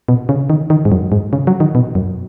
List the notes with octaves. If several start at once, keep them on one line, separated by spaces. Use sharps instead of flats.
B2
C#3
D#3
D#3
G#2
F#2
G#2
C#3
F#3
D#3
B2
F#2